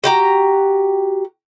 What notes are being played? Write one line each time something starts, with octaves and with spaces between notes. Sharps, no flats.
F#4 G4 A#5